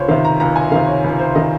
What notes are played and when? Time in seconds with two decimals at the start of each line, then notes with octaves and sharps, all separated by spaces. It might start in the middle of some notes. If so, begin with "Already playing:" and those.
Already playing: C#2 C5 C#5
0.08 C3 D#3 F5
0.25 A#5
0.40 C#2 A#5
0.56 G#5
0.72 D#3 F5
0.75 C3
0.87 C#5
1.04 C#2
1.19 C5
1.35 C3 D#3 D#5